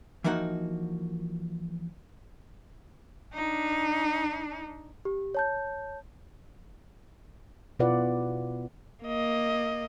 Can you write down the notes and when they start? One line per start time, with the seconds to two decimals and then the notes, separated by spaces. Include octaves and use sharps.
0.24 E3 F3 A#3 D#4 F#4 F#5
3.34 D4 D#4
5.05 G4
5.35 C#5 A5 G6
7.79 B2 E4 F4 B4 D5 F#5
9.05 A#3 D#5